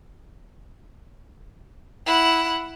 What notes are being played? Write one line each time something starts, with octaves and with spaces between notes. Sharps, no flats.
E4 F#5